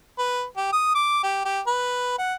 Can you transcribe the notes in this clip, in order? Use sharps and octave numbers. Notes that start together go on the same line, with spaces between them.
B4
G4
D#6
D6
G4
G4
B4
F#5